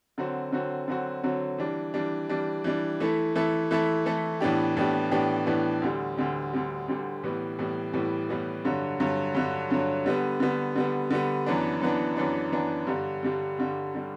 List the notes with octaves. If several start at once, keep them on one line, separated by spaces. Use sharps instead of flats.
D3 F#3 C4 F#4
D3 F#3 C4 F#4
D3 F#3 C4 F#4
D3 F#3 C4 F#4
E3 G3 D4
E3 G3 D4
E3 G3 D4
E3 G3 D4
E3 A3 E4 A4
E3 A3 E4 A4
E3 A3 E4 A4
E3 A3 E4 A4
A2 E3 B3 D4 G4
A2 E3 B3 D4 G4
A2 E3 B3 D4 G4
A2 E3 B3 D4 G4
D2 D3 G3
D2 D3 G3
D2 D3 G3
D2 D3 G3
A2 E3 G3 B3
A2 E3 G3 B3
A2 E3 G3 B3
A2 E3 G3 B3
G2 D3 F#3
G2 D3 F#3
G2 D3 F#3
G2 D3 F#3
D3 G3 B3
D3 G3 B3
D3 G3 B3
D3 G3 B3
F#2 E3 B3 D4
F#2 E3 B3 D4
F#2 E3 B3 D4
F#2 E3 B3 D4
G2 D3 G3
G2 D3 G3
G2 D3 G3
D3 G3